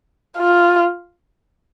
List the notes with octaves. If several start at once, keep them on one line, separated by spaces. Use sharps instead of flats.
F4